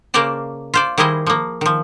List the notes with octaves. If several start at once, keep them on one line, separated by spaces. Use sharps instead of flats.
C#3 A#3 A#4 C5 D5 A5
F4 C5 D5
D#3 G3 E4 G#4 C5 D#5
F3 A#3
D#3 F3